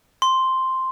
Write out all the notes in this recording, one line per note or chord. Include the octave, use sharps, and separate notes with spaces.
C6